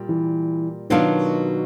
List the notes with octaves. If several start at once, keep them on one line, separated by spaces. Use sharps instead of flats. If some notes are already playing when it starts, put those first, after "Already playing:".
Already playing: A#2 G3
E3
B2 D#3 F#3 A#3 D4 F4